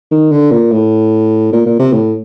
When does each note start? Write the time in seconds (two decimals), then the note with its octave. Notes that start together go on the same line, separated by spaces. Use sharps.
0.11 D#3
0.31 D3
0.51 A#2
0.72 A2
1.52 A#2
1.66 A#2
1.79 C3
1.93 A2